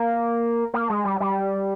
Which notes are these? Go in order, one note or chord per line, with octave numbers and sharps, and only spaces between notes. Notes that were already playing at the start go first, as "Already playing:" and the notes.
Already playing: A#3
A#3
G#3
G3
G3